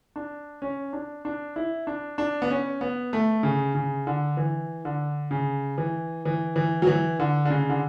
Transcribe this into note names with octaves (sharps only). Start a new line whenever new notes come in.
D4
C#4
D4
D4
E4
D4
D4
B3
C#4
B3
A3
C#3
C#3
D3
E3
D3
C#3
E3
E3
E3
F#3
E3
D3
D3
C#3
D3